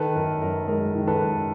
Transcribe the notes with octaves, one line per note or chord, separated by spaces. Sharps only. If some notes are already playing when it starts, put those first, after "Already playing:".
Already playing: D#3 A4 B4
F#2 A#4
F#2 A#4
G#3 A#4
D#3
A4 B4
F#2